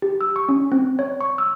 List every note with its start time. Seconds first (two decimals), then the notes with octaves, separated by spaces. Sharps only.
0.02 G4
0.21 E6
0.36 C#6
0.49 C#4
0.72 C4
0.99 C#5
1.21 C#6
1.38 E6